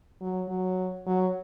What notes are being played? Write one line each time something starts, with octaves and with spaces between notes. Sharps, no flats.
F#3
F#3
F#3